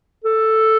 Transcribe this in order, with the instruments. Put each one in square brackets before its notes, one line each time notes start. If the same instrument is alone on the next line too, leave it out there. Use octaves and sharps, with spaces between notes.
[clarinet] A4